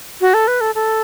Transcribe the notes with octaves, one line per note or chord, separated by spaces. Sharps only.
F#4
A4
B4
A4
A4